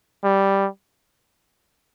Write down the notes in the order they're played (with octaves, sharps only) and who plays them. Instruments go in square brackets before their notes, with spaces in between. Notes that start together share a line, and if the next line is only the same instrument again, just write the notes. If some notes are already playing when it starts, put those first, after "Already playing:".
[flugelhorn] G3